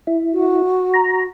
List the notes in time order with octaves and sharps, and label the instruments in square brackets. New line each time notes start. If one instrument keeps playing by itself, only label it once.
[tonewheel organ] E4
[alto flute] F#4
[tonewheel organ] A#5